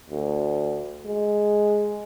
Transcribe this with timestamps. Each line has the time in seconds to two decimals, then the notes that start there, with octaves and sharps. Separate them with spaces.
0.10 D2
1.06 G#3